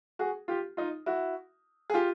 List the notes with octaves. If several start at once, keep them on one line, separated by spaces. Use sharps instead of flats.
F#4 G#4
F4 G4
D#4 F4
E4 F#4
G#4
F4 G4